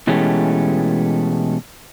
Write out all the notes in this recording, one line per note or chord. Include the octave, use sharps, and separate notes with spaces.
B2 E3 G#3 A3 C#4 G4